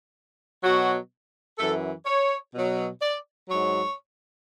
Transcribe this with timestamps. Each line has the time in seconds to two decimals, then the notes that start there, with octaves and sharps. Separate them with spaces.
0.63 B2 F#3 F#4
1.58 F#2 E3 A4
2.06 C#5
2.54 B2 F#3
3.02 D5
3.49 G#2 F#3 C#5